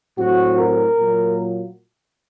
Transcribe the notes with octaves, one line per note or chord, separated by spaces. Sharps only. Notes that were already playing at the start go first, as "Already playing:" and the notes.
A2 F#3 C4 F#4
A#4
A#2 F#3 A#3